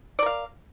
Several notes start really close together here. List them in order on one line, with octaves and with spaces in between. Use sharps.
D5 A#4 F5